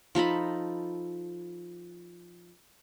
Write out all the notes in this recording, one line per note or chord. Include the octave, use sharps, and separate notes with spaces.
F3 D#4 A4 B5